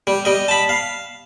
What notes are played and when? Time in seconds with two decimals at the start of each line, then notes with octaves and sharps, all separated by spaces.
0.07 G3
0.25 G3 D#5
0.48 A5 B5
0.69 F5